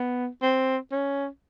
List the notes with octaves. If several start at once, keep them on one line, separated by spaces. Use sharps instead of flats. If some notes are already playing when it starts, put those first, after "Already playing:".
Already playing: B3
C4
C#4